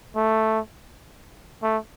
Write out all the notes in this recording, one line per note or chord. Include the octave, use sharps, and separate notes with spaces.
A3
A3